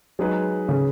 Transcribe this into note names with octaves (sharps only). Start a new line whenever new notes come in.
F#3 G#3 D#4 G#4 B4
C#3